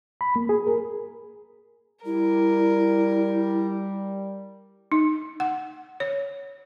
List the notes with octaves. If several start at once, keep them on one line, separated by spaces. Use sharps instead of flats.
B5
A#3
G#4
A#4
G3 E4 A#4
D#4
F#5
C#5